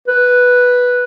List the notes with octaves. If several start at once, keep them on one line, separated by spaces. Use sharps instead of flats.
B4